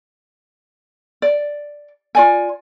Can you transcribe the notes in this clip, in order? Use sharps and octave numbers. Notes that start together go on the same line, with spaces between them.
D5
F4 D5 G#5